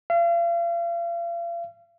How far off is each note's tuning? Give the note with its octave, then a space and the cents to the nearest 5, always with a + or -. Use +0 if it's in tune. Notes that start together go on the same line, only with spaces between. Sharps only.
F5 -40